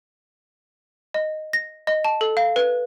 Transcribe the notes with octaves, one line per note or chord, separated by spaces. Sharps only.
D#5
A#6
D#5
A5
A4
F5
B4